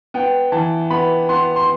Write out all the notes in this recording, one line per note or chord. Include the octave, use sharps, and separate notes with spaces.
B3 G5
E3 A5
B3 B5
B3 C6
C6